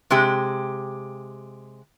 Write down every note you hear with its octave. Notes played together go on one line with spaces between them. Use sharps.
C3 G#3 G4